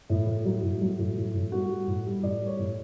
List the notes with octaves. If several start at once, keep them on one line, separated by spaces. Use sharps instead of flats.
A2
A2
F#3
A2
F#3
A2
A2
A2
G3 F#4
G3
A2
G3
A2 D5
G3
C#5
A2